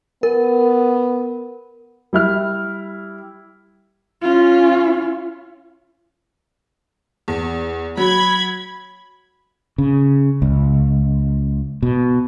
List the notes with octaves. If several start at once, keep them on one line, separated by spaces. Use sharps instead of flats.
B3 A#4
G3 E4 F6
C#4 F4
E2
F#3 B5 G#6
C#3
C#2
B2